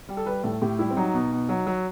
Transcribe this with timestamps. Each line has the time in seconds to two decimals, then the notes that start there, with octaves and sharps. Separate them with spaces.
0.09 G3
0.17 A4
0.26 G3 B4
0.43 A2 A4
0.61 A2 G4
0.79 G3 E4
0.91 C4
0.96 F#3 D#4
1.14 B2
1.32 B2
1.49 F#3
1.67 F#3